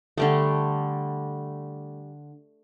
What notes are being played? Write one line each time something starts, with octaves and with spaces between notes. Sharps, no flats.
D3 G3 A3